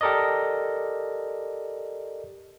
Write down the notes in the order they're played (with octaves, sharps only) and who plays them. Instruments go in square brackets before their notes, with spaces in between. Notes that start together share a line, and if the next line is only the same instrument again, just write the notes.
[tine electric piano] G4 A4 A#4 D5 D#5